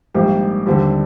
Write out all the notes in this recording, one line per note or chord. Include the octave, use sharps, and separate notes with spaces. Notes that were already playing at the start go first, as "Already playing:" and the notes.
A#1 G#2 G3 A#3 G4
D#2 D3 G3 C4